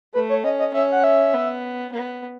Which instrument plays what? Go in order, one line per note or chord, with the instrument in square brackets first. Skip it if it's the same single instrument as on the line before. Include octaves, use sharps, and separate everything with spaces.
[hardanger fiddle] A3 [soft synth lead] B4
[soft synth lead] C#5
[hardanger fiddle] C#4 [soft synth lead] D#5
[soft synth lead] D#5
[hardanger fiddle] C#4 [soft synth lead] E5
[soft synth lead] F#5
E5
[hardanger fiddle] B3
B3